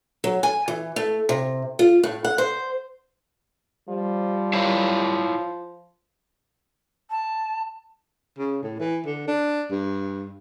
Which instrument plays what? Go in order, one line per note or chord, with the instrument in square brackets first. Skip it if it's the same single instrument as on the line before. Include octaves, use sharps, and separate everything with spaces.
[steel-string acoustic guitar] F#3
G#5
E3
A3
C3
F4
A2
F#5
C5
[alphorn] F3 [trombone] G3
[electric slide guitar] E4 C#5 F5
[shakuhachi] A5
[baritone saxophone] C#3
A2
E3
D3
D4
G2